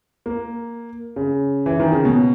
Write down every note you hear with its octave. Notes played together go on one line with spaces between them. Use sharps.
A#3
C#3
E3
D#3
C#3
B2